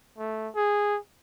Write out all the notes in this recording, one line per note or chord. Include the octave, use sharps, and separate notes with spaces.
A3
G#4